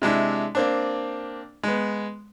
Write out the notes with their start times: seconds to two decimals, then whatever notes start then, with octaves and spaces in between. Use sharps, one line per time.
0.02 C3 G#3 D4 E4
0.55 A#3 C4 D4
1.63 G#3 B3